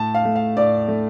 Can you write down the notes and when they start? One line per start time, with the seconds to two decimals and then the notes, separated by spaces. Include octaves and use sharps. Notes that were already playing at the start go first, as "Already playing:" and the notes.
Already playing: A2 A5
0.15 F5
0.25 A3
0.35 F5
0.57 A2 D5
0.88 A3